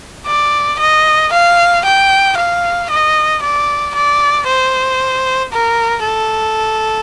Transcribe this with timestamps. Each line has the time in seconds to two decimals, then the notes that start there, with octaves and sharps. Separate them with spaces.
0.27 D5
0.80 D#5
1.33 F5
1.85 G5
2.37 F5
2.90 D#5
3.42 D5
3.95 D5
4.48 C5
5.53 A#4
6.05 A4